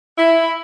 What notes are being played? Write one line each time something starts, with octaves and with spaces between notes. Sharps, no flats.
E4